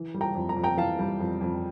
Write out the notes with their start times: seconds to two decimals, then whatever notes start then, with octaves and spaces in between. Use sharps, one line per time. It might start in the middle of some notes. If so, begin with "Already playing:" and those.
Already playing: E3
0.14 G3
0.21 G5 A#5
0.35 F2
0.49 A#5
0.57 F2
0.63 G5 A#5
0.77 E3 F5 A5
0.99 G3
1.20 F2
1.41 F2